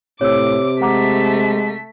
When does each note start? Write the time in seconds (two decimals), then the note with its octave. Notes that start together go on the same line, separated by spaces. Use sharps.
0.21 A2 C3 C#5 D6 E6
0.82 G#3 A3 F#5 A#5 D6 B6